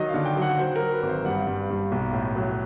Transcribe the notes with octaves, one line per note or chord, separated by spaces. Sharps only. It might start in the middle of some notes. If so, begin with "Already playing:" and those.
Already playing: D#3 F#3 D#5
F5
D3
G5
F#3 F#5
F#3 C5
A#4
F#3
B4
G#1
C5
G2 F#5
G2
G2
B1
A2
F#3